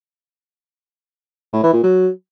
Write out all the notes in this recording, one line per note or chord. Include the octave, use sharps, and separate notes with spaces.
A2
E3
A#2
F#3